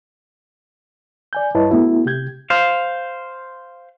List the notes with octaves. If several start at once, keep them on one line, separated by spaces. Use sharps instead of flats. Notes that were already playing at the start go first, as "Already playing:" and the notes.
D5 G#5 G6
G2 E4 B4 C#5 D#5 A5
A3 B3 E4 F#4
C3 G4 G6 G#6
C5 F5